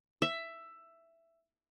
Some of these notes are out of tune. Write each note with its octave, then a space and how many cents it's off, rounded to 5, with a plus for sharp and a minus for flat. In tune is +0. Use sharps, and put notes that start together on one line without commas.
E5 +10